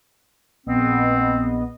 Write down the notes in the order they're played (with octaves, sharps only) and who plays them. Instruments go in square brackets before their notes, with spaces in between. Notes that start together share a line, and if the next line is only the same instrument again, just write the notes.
[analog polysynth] A#1 B3 D#5 [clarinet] C4